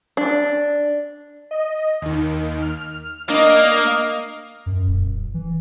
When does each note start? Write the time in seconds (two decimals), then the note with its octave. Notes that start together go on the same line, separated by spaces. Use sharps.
0.17 D4
1.51 D#5
2.02 D#2 D#3
2.62 F6
3.30 A#3 D4 D#5
4.66 F#2
4.87 D#1
5.34 E3